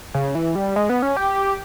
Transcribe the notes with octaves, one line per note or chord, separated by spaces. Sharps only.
C#3
E3
G3
G#3
B3
C#4
G4